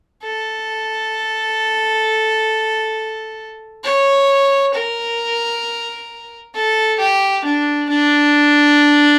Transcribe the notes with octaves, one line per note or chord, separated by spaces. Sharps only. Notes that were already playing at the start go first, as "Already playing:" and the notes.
A4
C#5
A#4
A4
G4
D4
D4